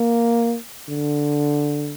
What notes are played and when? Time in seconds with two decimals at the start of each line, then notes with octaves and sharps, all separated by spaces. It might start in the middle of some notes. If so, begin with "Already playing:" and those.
Already playing: A#3
0.89 D3